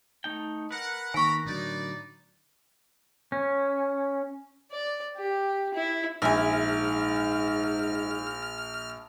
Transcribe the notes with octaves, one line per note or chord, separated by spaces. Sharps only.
A3 D#4 G5
A#4 B4 F#5
D#3 A#3 G#5 A#5 B5 C#6
A2 D3 F#3 D#4 D5
C#4
D5
G4
E4
A#1 G#2 E5 G#5 F6